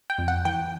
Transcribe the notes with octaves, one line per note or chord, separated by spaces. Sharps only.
G5
F2
F#5
E3 G5